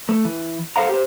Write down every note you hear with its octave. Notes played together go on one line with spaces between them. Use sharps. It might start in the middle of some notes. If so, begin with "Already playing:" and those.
A3
E3
A4 B4 C5 F5 F#5 A#5
G4 C5